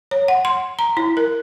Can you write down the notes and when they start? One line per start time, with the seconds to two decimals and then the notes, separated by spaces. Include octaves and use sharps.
0.11 C#5
0.28 F#5
0.45 C6
0.79 A#5
0.97 E4
1.17 A#4